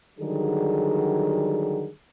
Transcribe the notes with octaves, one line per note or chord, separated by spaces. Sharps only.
D3 D#3 F#3 G3 G#4